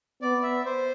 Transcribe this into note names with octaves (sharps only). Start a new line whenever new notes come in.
B3 D5
E5
C5